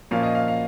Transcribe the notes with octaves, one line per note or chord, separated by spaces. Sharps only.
A#2 F3 A#3 C#4 F5
D#5
F5
F5